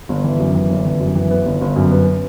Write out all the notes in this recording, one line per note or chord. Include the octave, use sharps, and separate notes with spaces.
G1
E3
F#2
E3
G1
E3
F#2
E3
B3
G1
G1
F#2
B3